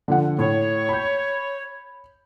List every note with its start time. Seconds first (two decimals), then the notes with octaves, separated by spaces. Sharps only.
0.08 D3 F3 F#5
0.38 A2 C#5
0.89 B5 G6